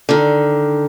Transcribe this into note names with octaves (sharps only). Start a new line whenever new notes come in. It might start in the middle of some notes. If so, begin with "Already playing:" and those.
D3 D#3